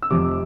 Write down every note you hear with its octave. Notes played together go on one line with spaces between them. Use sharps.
E6
F1 F2 C3 D6